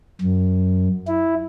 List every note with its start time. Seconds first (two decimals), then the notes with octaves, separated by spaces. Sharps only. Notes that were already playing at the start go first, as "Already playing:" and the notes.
0.21 F#2
1.07 E4